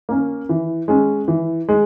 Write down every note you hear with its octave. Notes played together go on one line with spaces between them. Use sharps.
A#3 C#4
E3
G#3 C#4
E3
G#3